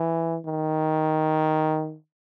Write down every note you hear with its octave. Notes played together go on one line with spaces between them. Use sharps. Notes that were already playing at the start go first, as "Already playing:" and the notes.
Already playing: E3
D#3